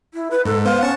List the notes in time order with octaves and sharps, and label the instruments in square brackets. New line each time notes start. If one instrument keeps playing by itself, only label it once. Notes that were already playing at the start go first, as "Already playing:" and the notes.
[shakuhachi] E4
B4
[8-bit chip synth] G#2 [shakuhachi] A4
[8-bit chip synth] B3 C5 [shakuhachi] F5
[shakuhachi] C#4 [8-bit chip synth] F#5 A5 C#6